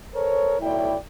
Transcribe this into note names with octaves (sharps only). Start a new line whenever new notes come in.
A4 A#4 C5 C#5
B1 A2 E4 D5 G5